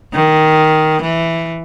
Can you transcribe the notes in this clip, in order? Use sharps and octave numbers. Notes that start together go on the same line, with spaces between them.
D#3
E3